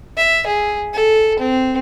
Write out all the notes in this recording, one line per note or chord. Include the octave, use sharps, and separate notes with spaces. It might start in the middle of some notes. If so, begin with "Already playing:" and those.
E5
G#4
A4
C4